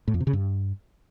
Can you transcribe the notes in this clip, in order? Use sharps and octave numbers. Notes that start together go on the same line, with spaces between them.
A2
F2
C3
C#3
G2